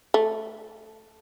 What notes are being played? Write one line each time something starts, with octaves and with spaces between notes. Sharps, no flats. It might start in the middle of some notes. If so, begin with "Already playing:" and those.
A3